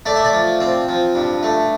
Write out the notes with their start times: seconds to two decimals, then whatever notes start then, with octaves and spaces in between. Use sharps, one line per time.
0.06 A3 D5
0.16 E5
0.25 D5
0.33 F3
0.61 C4
0.88 F3
1.15 G2
1.43 A3